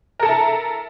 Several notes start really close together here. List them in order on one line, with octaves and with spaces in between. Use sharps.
A#4 A4 A5 E4